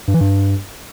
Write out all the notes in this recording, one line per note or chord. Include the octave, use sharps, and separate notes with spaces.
G2
E3
G2